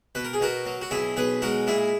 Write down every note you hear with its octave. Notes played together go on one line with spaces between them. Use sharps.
B2 B4
A#4
G#4
B2 F#4 A#4
F#3
F#4
B1 E4 G#4
B1 G#4 B4
G#3 F#4 A#4
A#2 E4 G#4